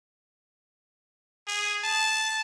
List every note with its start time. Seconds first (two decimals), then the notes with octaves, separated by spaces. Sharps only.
1.48 G#4
1.84 A5